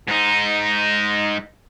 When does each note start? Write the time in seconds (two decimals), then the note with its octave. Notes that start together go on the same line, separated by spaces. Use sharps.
0.08 G#2 D#4